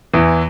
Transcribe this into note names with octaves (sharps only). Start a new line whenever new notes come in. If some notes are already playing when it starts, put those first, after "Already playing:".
E2 E3